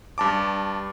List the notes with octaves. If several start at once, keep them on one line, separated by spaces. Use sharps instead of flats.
G2 A5 D6